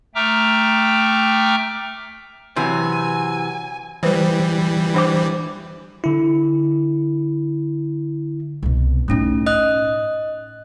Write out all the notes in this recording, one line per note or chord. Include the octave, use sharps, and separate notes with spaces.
A3 E5 G5 A#5 D6 F6
C3 E3 F#3 G#5
E3 G3 B4 C5
D4 C5 D6
D3 E4
C2 B2
A2 A3 C#4 D#4
D#5 D#6 F#6